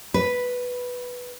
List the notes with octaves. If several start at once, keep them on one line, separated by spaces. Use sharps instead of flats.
B4